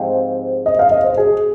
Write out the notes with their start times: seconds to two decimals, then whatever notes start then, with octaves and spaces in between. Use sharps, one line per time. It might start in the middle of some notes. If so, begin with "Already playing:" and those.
Already playing: G#2 F3 C4 G4
0.66 D#5
0.79 F5
0.92 D#5
1.04 C5
1.18 G#4